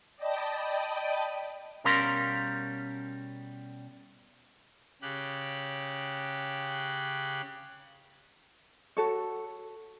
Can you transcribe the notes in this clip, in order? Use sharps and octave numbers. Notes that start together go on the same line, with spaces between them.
D5 D#5 G5 A5 B5 D#6
B2 G3 C#4 A#4 F5 C6
C#3 G4 F#6
F#4 A4 C#5